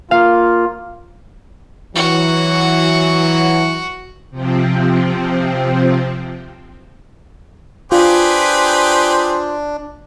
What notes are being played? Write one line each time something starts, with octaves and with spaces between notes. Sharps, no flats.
A#3 F4 F5
E3 F#3 F#4
C3 F3 C4
D4 F4 G4 G#4 B4 C5